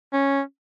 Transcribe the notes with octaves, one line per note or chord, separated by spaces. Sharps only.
C#4